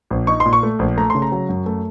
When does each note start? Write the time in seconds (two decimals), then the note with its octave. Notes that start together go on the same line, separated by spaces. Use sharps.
0.11 A#1
0.27 D#4 C#6
0.40 C6
0.45 A#2
0.53 C#6
0.63 A3
0.79 A#1
0.97 A3 A#5
1.10 C#3 C6
1.22 A#5
1.32 F#3
1.49 F#2
1.66 A3